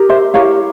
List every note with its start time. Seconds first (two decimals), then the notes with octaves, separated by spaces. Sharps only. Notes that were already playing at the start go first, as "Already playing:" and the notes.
Already playing: G4 A#4
0.09 C5 E5
0.34 E4 G4 A#4 C#5 F5